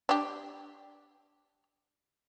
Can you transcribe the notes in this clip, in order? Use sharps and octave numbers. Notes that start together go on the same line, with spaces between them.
D4 G4